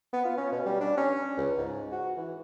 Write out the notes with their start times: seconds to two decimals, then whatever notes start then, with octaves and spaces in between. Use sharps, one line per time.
0.13 B3
0.25 F4
0.37 C#4
0.52 B2
0.66 G3
0.80 D4
0.98 C#4
1.37 C#2
1.58 G#2
1.92 F#4
2.17 E3